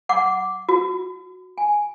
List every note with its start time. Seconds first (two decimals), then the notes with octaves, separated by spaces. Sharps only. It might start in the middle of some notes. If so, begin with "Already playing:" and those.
0.09 F#5 D6
0.69 F#4
1.58 G#5